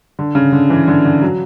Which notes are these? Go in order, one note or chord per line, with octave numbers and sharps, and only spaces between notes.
D3
C#3
D3
E3
D3
D3
F#3